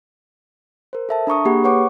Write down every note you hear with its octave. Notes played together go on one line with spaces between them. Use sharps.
A#4 C5
A4 E5 A5
D4 A#5 C#6 D#6
A#3 G4 G#4 F#5 B5 D#6
B4 C#5 F#5 C#6 D6